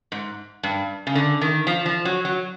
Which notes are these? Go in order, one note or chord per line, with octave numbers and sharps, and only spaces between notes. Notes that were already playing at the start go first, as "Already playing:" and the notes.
G#2
G2
C#3
D3
D#3
F3
F3
F#3
F#3